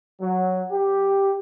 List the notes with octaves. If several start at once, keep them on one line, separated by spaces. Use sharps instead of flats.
F#3
G4